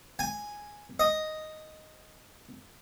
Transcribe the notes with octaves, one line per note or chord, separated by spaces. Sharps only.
G#5
D#5